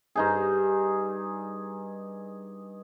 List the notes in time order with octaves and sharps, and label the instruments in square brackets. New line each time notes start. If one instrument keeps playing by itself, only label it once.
[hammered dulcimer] G2 D#4 G#4